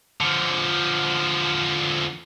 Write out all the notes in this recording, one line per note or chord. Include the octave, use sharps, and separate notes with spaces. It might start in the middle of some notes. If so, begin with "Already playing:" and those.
D3 F3